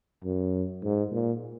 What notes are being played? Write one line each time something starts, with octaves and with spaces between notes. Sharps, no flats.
F#2
G#2
A#2